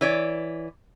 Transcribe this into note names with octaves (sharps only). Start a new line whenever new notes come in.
E3 C#5 D5